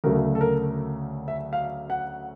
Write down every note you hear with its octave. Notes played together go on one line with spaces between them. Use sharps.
D2 C#3 F#3 A3 A#4
A4
A#4
E5
F5
F#5